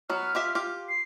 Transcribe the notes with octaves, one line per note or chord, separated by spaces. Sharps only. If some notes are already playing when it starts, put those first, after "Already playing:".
F#3 B3 F6
F4 G4 E5
F4 G4
C7